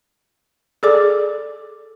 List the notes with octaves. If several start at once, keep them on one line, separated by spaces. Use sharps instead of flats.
G#4 A4 D5 D6